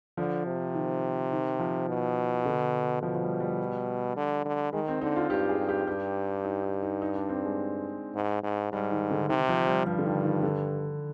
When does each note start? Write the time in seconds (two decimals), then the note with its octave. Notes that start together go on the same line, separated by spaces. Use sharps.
0.17 D3 F3
0.46 C3
0.75 D#3
1.32 D#3
1.59 F3
1.89 B2
2.46 D3
3.02 B2 F3
3.15 F3
3.22 G3
3.40 G3
4.16 D3
4.45 D3
4.73 D#3 G#3
4.88 C4
5.01 D3 D#4
5.16 F4
5.30 G2 G4
5.49 G#4
5.59 G2
5.69 G4
5.87 G2 G4
6.44 D#4
6.63 D#4
6.83 D#4
7.02 D#4
7.15 D4
7.29 C4
7.45 G#3
8.15 G#2
8.43 G#2
8.72 G#2 G3
8.91 D#3
9.11 D3
9.29 C3 D#3
9.49 F3
9.67 G3
9.86 G2 F3
9.99 D3
10.05 D#3
10.24 D#3
10.43 D3